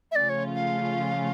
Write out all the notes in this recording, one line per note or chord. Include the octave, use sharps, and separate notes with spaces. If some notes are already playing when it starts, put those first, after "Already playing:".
E5
C#3 F3 A3 C#4 F4 D5
C#5
F5